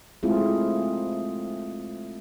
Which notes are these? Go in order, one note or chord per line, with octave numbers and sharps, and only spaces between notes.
G#3 A3 C4 E4 F4 G#4